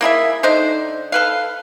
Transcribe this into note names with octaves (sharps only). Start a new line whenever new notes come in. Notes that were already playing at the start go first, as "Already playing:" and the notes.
A#3 E4 G#4 E5
D3 D#4 A4 C5
A4 B4 F5